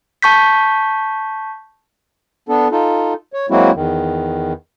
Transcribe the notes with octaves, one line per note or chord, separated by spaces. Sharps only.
A5 C#6 G6 B6
B3 D4 A4
D#4 F4 A4
C#5
F#3 G#3 A#3 C4 E4 F#4
E2 D#3